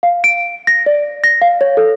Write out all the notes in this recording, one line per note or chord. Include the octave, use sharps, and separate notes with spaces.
F5
D7
A#6
D5
A#6
F5
C#5
A4